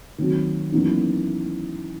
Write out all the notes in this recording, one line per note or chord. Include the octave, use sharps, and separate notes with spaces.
D#3 F#3 C4 F#4
F#2 E3 B3 D#4